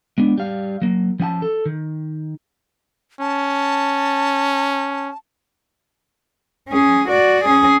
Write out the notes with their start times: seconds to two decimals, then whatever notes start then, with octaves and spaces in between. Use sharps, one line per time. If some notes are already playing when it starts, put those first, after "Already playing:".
0.18 G#3 B3 D4
0.38 G3 F5
0.82 F#3 A#3
1.20 F3 C#4 F#5 A5
1.42 A4
1.66 D#3
3.21 C#4 A5
6.69 C#4 G#4
7.08 F#4 D5
7.45 C#4 G#4